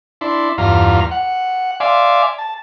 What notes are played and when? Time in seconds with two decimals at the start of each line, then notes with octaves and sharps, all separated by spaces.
0.21 D4 E4 C6
0.58 E2 G2 F4 A#5 F6
1.11 F#5
1.80 D5 E5 F5 G#5 C6 D6
2.38 A5